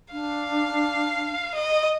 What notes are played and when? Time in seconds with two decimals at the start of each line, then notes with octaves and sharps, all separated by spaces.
0.12 D4 F5
1.54 D#5